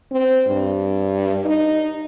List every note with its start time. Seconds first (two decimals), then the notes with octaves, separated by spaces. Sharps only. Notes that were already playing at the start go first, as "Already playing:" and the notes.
0.12 C4
0.47 G2
1.46 D#4